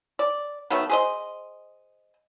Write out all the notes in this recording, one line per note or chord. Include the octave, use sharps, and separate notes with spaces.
D5
D#3 F#3 A3 B3
G#4 C5 D#5